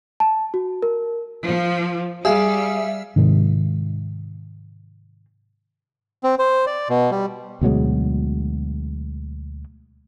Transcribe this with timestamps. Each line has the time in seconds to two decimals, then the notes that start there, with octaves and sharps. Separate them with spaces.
0.20 A5
0.54 F#4
0.82 A#4
1.44 F3
2.25 G3 G#4 E5 F5
3.16 G#2 C3 D#3 G#3
6.24 C4
6.39 C5
6.66 D5
6.90 B2
7.11 G3
7.61 D2 B2 F#3 G#3